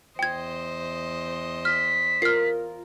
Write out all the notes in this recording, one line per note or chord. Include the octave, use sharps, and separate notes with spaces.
E2 C5 D#5 G5 G#6
F6 B6
F4 A#4 F6 C7